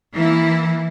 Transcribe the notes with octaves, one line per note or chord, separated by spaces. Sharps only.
E3 A#3 E4